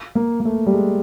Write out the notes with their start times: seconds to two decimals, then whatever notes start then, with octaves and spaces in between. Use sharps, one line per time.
0.15 A#3
0.40 A#3
0.45 A3
0.66 G3
0.74 G#3